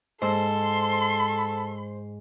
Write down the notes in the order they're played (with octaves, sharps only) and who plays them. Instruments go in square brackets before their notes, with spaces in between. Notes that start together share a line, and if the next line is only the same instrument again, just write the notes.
[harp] G#2 [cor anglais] A4 [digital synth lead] C5 [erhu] C6